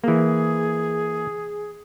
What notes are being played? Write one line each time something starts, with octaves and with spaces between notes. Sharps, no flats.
E3 A#3 G#4